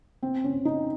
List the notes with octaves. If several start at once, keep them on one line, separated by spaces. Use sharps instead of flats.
C4
C#4
D#4